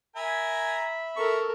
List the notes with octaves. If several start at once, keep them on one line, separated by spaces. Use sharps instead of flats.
A#4 E5 G#5 A#5 B5
A4 A#4 C#6